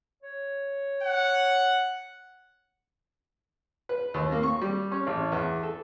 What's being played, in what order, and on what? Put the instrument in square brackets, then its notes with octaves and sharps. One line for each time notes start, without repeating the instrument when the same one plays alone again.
[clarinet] C#5
[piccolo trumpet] F#5
[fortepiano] B4
D#2
A#3
C#6
G3
C#4
A1
E2
A4